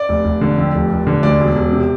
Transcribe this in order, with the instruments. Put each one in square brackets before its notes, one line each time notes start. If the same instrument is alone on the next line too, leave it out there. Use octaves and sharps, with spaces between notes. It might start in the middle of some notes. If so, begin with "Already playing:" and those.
Already playing: [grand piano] D5
F1
F1
D3
F2
F1
F1
D3
D2 D5
E1
E1
C3